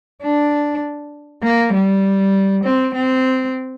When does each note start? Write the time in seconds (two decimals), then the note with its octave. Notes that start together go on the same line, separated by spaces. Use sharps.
0.23 D4
1.43 A#3
1.74 G3
2.64 C4
2.94 C4